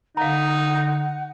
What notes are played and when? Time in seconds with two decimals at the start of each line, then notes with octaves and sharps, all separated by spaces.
0.17 D3 D#4 F5 F#5 A#5